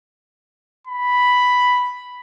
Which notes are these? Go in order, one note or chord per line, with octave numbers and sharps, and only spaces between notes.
B5